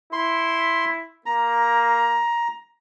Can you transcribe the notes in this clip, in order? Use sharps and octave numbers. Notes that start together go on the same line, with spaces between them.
E4 C6
A#3 A#5